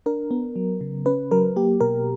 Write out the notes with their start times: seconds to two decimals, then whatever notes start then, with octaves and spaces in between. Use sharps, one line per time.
0.06 D4 A#4
0.31 B3
0.56 F#3
0.81 C#3
1.06 C#4 B4
1.31 F#3 A#4
1.56 A#3 G4
1.81 B2 A#4